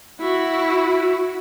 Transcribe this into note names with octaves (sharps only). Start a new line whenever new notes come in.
E4 F#4